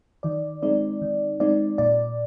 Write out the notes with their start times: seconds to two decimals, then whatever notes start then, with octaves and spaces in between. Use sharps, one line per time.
0.23 D#3 D5
0.62 G#3 C4 D#4 D5
1.02 D#3
1.40 G#3 C4 D#4 D5
1.78 A#2 D5